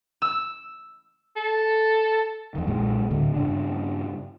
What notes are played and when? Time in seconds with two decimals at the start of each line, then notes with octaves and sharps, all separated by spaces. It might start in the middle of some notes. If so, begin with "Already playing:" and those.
0.22 E6
1.36 A4
2.55 F2 D#3
2.67 B1 A#2 G#3
3.11 D2 A2 D3
3.34 G2 C#3 D4